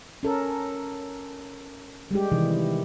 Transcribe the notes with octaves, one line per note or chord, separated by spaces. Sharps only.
C#4 A4 A#4
G3 G#3 G4
C3 D#3 E3